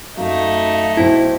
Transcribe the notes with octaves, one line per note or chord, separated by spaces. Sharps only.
F#2 A3 D#4 F5
B1 E4 C5 G5 A5